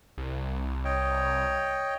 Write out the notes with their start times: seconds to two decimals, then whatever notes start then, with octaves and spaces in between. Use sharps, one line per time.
0.18 C2
0.85 C#5 D#5 G5